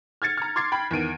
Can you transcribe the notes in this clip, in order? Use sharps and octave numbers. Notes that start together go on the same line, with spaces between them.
F6 G#6 A6 C#7
A#5 F6
C6 D6 G#6 A6 C7
G5 B5
E2 D#3 D7 D#7